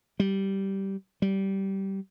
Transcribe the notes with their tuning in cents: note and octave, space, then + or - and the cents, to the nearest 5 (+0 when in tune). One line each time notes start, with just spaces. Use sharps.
G3 -10
G3 -15